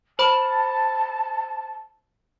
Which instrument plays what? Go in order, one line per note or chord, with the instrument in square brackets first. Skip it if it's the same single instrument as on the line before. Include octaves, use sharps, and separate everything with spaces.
[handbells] C5 B5 [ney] A5